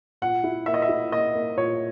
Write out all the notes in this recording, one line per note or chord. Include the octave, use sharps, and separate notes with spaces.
A#2 F#5
E4
A#3 E5
D#5
E5
E4
A#3 D#5
A#3
A#2 C#5